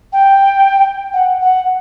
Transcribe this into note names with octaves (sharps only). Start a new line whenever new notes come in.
G5
F#5
F#5